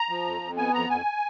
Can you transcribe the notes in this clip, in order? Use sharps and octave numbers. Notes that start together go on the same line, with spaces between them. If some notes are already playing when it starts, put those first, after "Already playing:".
Already playing: A#5
F3
F2
F2
B3 G#5
F2 A#5
F2 G#5